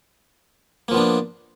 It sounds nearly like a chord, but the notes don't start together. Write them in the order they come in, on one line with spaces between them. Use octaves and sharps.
A#3 F3 B3 D4